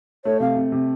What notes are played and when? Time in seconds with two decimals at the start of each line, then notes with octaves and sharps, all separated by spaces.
0.25 A3 C#5
0.40 C3 F5
0.56 C3
0.72 C3